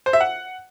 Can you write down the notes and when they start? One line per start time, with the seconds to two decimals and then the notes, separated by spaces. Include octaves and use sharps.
0.06 C5
0.13 E5
0.20 F#5